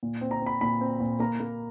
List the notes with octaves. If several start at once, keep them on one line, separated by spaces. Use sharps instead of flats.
A#2
C4
A#5
C4
B5
A#2 B5
C4
A#2
A#3 A#5
A#3